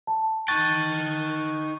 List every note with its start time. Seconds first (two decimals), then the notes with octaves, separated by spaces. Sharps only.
0.07 A5
0.48 D#4 G5 C#6 F#6 A6